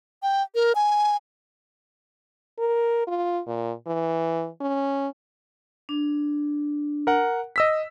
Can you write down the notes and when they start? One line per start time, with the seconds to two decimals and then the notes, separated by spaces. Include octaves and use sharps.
0.23 G5
0.55 A#4
0.75 G#5
2.59 A#4
3.07 F4
3.47 A#2
3.87 E3
4.61 C#4
5.89 D4
7.07 A#4 F#5
7.56 D#5 E6 B6